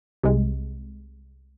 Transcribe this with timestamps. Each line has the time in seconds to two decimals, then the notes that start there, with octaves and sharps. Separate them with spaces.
0.23 C2 C3 G#3